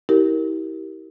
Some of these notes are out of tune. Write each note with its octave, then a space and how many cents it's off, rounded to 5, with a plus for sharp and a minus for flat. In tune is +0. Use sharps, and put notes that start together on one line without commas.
E4 -35 G4 -15 A#4 +0